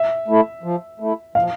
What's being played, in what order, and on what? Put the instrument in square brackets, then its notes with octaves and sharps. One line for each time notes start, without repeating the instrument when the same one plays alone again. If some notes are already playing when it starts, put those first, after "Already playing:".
Already playing: [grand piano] E5
[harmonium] A3 E4
F3
A3 E4
[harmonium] F3 [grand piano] F5